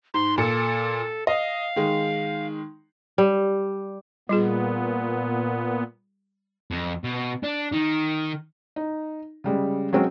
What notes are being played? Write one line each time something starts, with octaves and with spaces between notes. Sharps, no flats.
G#2 C6
A#2 A4 C#7
D#5 F5
D#3 G#3
G3
A#2 G3 B3 F4 G#4
F2
B2
D4
D#3
D#4
C#3 G3 G#3
F#3 G#3 C4 C#4 F#4